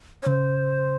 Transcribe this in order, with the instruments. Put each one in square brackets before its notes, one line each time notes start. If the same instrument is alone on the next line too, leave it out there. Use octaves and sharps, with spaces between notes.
[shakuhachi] C#5
[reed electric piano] C#3 [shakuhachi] C5